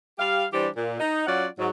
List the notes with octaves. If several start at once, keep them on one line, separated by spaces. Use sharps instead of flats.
G3 G4 F5
E3 G3 D4 G4 C5
A#2
D#4
F#3 C#4 F4 D5 F#5
G#2 F#3